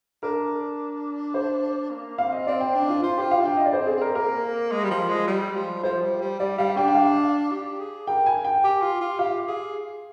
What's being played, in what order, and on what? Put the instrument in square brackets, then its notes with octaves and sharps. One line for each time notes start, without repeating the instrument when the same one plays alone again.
[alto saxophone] D4 [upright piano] A#4
[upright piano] C5
[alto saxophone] A#3
[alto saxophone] C4 [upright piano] F5
[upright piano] D#5
[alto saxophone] C4 [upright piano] D5
[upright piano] G5
[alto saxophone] D4
[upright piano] F4
[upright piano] F4 [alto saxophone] C5
[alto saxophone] F4 [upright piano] G4
[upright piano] F5
[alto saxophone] D4
[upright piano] G5
[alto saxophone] D4 [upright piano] D#5
[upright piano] D5
C5
[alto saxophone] C4
[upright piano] G#4
[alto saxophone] C4
[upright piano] A#4
[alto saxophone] A#3 [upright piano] A#4
[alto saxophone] G#3
G3
F3
G#3
G3
F3
[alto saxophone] F3 [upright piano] C5
[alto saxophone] G3
G3
[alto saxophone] G3 [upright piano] D5
[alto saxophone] G3 [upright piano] F5
[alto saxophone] D4 [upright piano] G5
[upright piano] G5
F5
[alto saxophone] G4
G#4
[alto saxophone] A#4 [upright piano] G5
[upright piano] G#5
G5
[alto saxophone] G4
F4
F4
[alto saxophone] G4 [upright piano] F5
[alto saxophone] G4
G#4